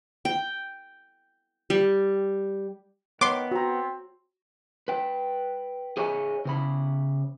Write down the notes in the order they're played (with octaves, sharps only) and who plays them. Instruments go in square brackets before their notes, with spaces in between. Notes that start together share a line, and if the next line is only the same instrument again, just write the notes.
[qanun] G5
G3
[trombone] D#3 [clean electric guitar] B3 [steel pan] C#5 [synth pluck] C6 D6
[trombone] C4 [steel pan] F#4 A#5
[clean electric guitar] B4 G5
G#4 C5 C#5 D#5 G5 G#5
C#3 C5 B5